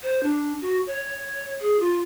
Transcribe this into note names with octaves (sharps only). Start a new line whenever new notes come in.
C5
D4
F#4
C#5
G#4
F4